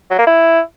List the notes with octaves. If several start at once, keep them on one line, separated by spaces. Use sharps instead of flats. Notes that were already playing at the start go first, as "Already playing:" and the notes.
F#3
A#3
E4